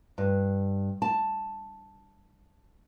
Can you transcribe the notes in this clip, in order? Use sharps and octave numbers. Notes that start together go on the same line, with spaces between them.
G2
A5